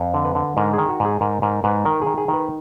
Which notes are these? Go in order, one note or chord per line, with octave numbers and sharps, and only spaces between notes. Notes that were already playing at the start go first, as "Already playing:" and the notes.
Already playing: F2
D3
B4
D3
G#2 A#4
D#3 G#4
F#4
G#2
G#4
G#2 A#4
G#2 A#4
G#2 B4
D#3 A#4
D#3 G#4
G#4
D#3
B4